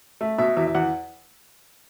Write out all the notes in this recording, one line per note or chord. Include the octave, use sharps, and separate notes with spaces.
A3 E5
B2 E5
E2 E5
E5
E2 F#5